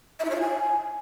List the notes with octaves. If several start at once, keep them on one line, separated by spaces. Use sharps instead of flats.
E5
E4
C#5
F4
G#5